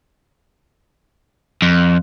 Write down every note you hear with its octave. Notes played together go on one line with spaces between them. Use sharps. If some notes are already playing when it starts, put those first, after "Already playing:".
F2